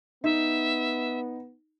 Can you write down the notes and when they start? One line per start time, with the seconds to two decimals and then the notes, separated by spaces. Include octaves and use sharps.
0.24 B3 D#4 E5